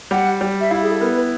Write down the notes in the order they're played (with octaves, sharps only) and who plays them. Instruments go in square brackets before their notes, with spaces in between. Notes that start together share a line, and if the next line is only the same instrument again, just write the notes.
[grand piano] G3 [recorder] F#5
[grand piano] G3
[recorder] E5
[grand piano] E4 [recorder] F5
[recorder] G#4
A4
[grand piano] B3 [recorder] A#4
[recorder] B4